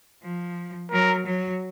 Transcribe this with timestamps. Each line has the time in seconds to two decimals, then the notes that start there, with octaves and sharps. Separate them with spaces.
0.23 F3
0.91 F#3 A#4
1.26 F#3